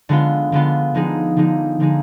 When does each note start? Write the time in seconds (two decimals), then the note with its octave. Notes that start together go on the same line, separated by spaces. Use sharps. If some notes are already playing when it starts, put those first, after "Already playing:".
0.09 D3 G#3 B3 F4
0.52 D3 G#3 B3 F4
0.94 D3 F3 G#3 D#4 G#4
1.36 D3 F3 G#3 D#4 G#4
1.80 D3 F3 G#3 D#4 G#4